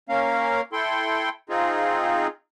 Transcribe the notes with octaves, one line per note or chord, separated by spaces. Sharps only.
A#3 C#4 A#4 F5
E4 A4 G5 C6
C4 D#4 F4 G#4